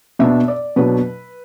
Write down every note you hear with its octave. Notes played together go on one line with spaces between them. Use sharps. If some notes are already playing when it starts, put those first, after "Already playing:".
B2 B3 D4 E5
D5
B2 F#3 D4 B4